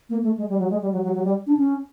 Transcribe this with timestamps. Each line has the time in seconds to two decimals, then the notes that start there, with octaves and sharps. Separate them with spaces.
0.09 A#3
0.23 A3
0.38 G#3
0.49 G3
0.59 F#3
0.70 G#3
0.81 G3
0.92 F#3
1.03 F#3
1.14 F#3
1.24 G3
1.47 D4
1.57 C#4